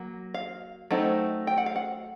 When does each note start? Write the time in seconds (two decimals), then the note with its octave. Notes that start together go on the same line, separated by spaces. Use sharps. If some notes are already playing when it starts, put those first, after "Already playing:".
Already playing: F#3 A#3
0.34 F5
0.91 F#3 A3 C4 D#4
1.47 G5
1.58 F#5
1.66 F5
1.76 F#5